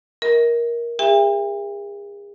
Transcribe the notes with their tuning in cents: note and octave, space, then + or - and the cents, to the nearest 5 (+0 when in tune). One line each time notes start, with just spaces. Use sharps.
A#4 +15 D#5 +45
G#4 -40 E5 +30 G5 +40